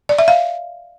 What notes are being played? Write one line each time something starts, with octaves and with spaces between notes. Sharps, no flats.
D5
E5
F5